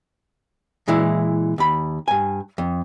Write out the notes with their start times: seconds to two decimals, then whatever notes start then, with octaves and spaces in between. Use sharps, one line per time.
0.88 A#2 E3 G#3 E4
1.58 D#2 B5
2.08 G2 G#5
2.58 F2